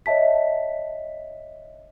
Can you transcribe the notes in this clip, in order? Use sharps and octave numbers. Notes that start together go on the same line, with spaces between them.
C#5 D#5 E5 A5 B6